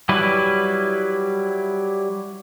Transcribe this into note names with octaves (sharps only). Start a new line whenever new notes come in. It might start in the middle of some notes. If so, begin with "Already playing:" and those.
F#3 G3 E4 B4